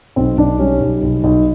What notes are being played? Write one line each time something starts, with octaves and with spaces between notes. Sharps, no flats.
B1 C4
B1 D4
G3 C#4
B1
B1
B1